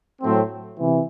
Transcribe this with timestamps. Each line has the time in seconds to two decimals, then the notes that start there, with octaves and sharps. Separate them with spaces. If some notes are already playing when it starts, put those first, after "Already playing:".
0.22 A2 F#3 A3 C4
0.78 C3 E3